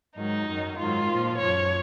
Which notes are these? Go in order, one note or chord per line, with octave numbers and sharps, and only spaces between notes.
G#2 D#3 F#3 D#4
F#2 D#3 F#3
G#2 D#3 F#3 F4
A#2 F3
F#2 F3 C#5